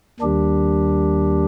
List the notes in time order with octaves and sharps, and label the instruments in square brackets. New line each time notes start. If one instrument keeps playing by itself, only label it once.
[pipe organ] D#2 D#3 G3 D4 G4